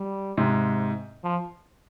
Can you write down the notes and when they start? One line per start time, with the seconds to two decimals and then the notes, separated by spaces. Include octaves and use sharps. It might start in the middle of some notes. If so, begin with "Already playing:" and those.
Already playing: G3
0.37 G#2 C3
1.23 F3